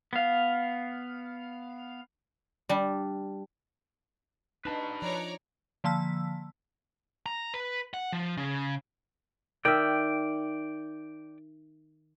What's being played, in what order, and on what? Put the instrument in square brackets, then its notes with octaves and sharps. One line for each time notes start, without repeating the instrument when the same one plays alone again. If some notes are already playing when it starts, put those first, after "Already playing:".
[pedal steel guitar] B3 F5
[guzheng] G3 D4
[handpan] D4 D#4 [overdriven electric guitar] B4 A5
[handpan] F3 [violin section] C#5 D5 A#5
[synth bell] D3 F3 A#3 A5 E6 B6
[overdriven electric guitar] A#5
B4
F#5
F3
C#3
[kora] D#3 E5 [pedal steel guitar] D5 G5